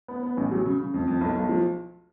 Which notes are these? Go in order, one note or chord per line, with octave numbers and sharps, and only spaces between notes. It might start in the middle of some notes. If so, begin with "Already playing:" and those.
B3
B3
A1
F#3
C#3
C#3
F2
F2
B1
B1
F3